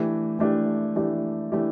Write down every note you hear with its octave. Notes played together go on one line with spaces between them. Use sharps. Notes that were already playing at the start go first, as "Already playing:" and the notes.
Already playing: E3 A3 D4 G4
E3 A3 D4 G4
E3 A3 D4 G4
E3 A3 D4 G4